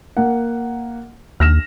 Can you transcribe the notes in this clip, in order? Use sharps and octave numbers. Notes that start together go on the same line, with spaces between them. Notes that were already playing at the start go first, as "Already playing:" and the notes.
A#3 F#5
D#2 F6 A#6 E7